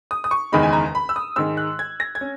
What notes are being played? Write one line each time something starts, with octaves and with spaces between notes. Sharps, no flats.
D#6
D#6
C#6
F#1 E2 D#3 G#3 D#4 B5
G#5
A#5
B5
E6
D#6
G#2 D#3 G#3 E6
F#6
G#6
A#6
G#6
C#4